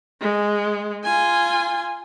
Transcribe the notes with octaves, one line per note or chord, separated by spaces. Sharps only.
G#3
F4 G#5